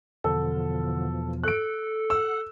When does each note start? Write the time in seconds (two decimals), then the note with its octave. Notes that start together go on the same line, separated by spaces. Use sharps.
0.24 E2 B2 D3 F3 A4
1.44 A4 F#6 D7
2.10 F#5 E6